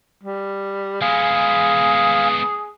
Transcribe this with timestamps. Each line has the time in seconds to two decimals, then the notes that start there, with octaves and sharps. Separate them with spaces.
0.24 G3
1.02 G#3 B3 G#4 F5 G#5